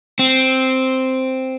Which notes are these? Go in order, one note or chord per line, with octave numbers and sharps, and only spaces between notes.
C4